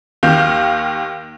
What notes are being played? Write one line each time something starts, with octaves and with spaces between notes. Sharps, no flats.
D#2 D#3 F5 G6